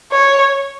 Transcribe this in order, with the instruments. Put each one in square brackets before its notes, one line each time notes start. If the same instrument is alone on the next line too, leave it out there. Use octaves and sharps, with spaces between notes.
[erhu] C#5